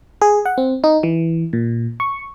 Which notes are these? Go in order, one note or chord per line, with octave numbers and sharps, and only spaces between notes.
G#4
F#5
C4
D#4
E3
A#2
C#6